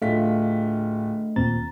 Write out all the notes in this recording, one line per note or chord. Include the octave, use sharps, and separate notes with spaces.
D1 A3 D4 F4 D#5 B6
D#2 A#2 C4 A#5 A6